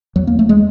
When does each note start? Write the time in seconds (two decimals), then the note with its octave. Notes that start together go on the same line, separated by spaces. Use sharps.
0.16 E2 F#3
0.27 A#3
0.39 A3
0.49 G#3